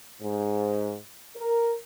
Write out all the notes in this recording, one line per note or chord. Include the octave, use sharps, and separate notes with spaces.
G#2
A#4